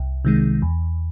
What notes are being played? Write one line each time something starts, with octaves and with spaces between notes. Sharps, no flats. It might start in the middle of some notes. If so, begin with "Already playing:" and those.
Already playing: C2
C3 D#3 G#3
E2